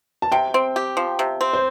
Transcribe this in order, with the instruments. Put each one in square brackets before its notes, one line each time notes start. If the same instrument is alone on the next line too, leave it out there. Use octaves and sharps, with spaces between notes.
[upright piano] A5
[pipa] C3 [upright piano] G5
[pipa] C4
G4
F3
C3
C4
[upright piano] C5